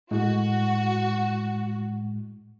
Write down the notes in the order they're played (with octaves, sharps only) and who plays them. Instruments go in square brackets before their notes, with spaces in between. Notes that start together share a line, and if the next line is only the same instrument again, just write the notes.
[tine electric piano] A2 G#3 E4 [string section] F#4